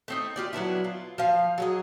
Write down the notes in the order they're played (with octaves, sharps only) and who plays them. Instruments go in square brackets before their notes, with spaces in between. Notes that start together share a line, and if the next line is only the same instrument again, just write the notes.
[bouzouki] A3 C4 D#4
F4 G4 D5
F#3 B3 D4 E4
F4
F3 F5
F#3 G#4 D#5